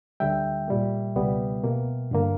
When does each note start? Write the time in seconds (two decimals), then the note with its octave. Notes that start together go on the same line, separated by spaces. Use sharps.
0.20 D2 D3 G3 E5 G5
0.68 A#2 G3 A#3
1.16 C#2 B2 G3 B3
1.64 B2 A#3
2.11 G2 D3 A#3